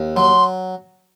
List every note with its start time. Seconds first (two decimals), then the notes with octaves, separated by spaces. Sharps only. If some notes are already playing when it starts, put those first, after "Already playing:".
Already playing: D#2
0.16 F#3 C6